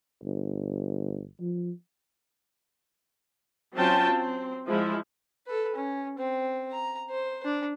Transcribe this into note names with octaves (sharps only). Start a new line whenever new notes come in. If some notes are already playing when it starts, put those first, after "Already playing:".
G1
F3
F#3 C4 C#4 F4 G5 A5
C4
F3 G#3 E4
A4 B4
C#4
C4
A#5
C5
D4